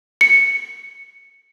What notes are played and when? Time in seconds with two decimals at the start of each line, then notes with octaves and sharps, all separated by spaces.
0.21 C#7